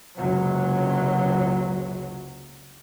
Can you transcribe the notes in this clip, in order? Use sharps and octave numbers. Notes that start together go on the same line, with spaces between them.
F#1 C#2 C3 F#3